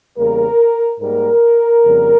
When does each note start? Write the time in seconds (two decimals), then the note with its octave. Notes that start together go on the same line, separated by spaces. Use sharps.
0.18 E2 C#3 G3 A#3 A#4
1.01 G#2 G3 A#3 A#4
1.84 F2 C#3 G3 A#3